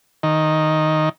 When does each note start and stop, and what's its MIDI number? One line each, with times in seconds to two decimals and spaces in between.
0.23 1.09 51